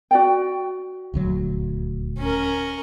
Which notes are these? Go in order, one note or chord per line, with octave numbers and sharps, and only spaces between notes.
F#4 D5 G5
D#1 D2 F#3
C#4 A#4